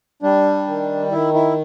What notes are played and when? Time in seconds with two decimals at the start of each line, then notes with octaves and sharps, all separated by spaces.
0.23 G3 D4
0.67 D#3
1.11 D#3 E4
1.34 E4